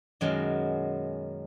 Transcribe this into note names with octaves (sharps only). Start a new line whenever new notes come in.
F#2 B2 D#3 F#3 G#3